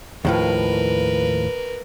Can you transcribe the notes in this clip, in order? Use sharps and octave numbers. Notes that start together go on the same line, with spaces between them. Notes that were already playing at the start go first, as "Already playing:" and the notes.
D#2 A2 F3 A#4 B4